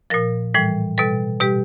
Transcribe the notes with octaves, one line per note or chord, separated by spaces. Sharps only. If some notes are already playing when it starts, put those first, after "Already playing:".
A#2 F3 A#4
A2 E3 G3
B2 G3 A4
B2 G3 G4